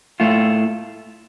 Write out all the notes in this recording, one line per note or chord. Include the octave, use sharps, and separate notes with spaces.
A2 A3 F4